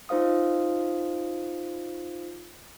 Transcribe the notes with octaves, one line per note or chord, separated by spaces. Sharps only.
D#4 F4 C5 F5 D#6